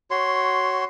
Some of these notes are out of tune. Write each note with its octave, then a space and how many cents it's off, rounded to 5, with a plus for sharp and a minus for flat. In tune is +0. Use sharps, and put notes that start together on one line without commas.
F#4 +15 C#5 +0 C6 +0